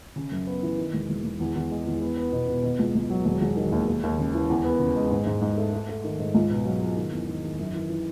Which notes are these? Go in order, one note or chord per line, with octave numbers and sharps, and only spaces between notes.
C#3
F#2
B3
E3
D#3
E1
E1
E1
E2
E2
G#3
E2
B3
B3
B2
B2
B2
C#2
C#2
F#3
E1
E1
D#3
D#2
D#2
D#2
C#3
E3
E2
B3
C#3
G#3
G#2
G#2
G#2
A3
A3
A3
D#3
G#2
C#2
B2
F#3
F#3
D#3
E2
D#3
D#3
F#2
E3
E3